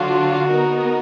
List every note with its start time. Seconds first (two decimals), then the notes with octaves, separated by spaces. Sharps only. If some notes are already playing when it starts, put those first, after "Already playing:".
Already playing: D3 F#3 D4 F4 F#4
0.49 B3 D#4 A#4